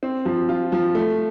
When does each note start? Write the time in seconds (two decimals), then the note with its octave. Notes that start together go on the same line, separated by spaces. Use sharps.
0.03 C4
0.25 F3
0.49 F4
0.72 F3
0.95 A3